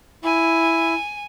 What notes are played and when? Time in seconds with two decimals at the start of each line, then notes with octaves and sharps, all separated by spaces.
0.24 E4 G#5